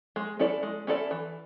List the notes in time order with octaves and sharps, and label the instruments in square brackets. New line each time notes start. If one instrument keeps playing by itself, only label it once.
[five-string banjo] G#3
C#4 E4 A4 D5
G#3
C#4 E4 A4 D5
E3